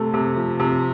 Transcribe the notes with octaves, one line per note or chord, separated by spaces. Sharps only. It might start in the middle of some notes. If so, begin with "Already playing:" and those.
Already playing: C3 A3
C3
F3
C3